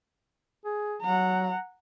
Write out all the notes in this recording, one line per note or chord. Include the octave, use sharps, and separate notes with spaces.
G#4
F#3 F#5 A#5